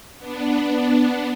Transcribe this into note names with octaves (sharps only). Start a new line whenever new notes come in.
B3 D4